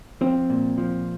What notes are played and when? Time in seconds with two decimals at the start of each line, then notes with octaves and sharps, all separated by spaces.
0.21 F3 C4
0.50 A#2
0.78 F3